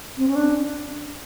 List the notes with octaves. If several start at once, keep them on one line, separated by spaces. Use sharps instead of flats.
C4
C#4
D4